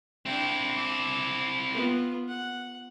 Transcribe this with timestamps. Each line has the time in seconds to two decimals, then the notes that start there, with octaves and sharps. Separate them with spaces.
0.26 C4 D4 E4 G5
0.76 D6
1.74 B3 F4
2.29 F#5